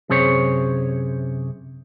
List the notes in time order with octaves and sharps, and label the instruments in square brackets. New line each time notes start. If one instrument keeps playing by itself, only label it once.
[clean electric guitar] F#2 C3 G#4 C5 C#5